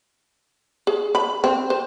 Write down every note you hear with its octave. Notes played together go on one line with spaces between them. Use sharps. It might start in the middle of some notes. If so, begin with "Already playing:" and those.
G#4
B5
C4
C5